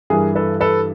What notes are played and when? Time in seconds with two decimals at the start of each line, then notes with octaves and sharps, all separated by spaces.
0.10 G2 E3 G#4 A#4
0.35 A4 B4
0.61 A4 B4